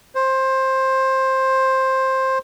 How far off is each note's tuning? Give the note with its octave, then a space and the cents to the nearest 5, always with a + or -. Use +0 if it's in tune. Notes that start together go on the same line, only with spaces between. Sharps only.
C5 +15